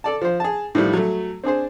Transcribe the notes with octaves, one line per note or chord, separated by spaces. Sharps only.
A4 D5 A5
F3 C5
G#4 A5
A2 D#3 F3 G3
F#3 A3
C4 D4 G#4 C5